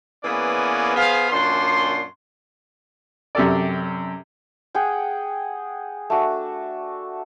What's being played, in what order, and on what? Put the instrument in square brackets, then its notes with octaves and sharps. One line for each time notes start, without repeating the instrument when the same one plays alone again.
[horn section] E3 A#3 B3 C#4 G#4 D5
B3 G#4 C5 F5
F#2 A#2 D4 C6
[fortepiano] F#2 C3 G4 A4 D5
[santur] G#4 F#5 G5
A3 D4 F#4